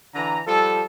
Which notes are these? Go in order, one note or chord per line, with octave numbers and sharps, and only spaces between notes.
D3 E3 A#5
F3 G3 A4